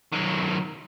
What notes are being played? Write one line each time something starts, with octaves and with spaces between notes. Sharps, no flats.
D#3 F#3